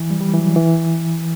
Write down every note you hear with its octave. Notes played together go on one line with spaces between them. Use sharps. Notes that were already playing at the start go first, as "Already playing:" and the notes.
Already playing: E3
G3
G3
E3
F#3
E3